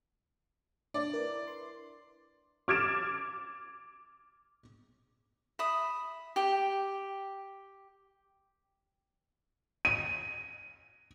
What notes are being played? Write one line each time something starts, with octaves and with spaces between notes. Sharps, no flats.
D4 D5
E4 A#4 B4
C6
D6 F6 G#6 A6 D7 E7
E5 B5 D#6
G4 G5
D#7